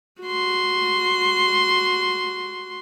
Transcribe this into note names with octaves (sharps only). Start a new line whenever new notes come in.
F#4 C6